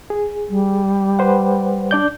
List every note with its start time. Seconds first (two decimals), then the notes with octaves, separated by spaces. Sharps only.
0.10 G#4
0.50 G3
1.19 B4 C5 F#5
1.91 D4 D5 G6